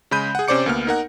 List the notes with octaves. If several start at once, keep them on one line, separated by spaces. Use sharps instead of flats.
C#3 G#3 B5 G6 D#7
G#4 F#5
C3 C#4 C5 D5 D6 C#7
D2 A#3 B3 F6
D#4 A#4 F#5